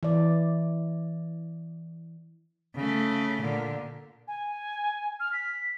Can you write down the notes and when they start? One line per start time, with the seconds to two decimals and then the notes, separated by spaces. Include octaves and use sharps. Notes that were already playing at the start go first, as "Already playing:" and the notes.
0.03 E3 D5
2.75 C#3 A3
3.41 A#2 D3
4.27 G#5
5.20 F6
5.32 B6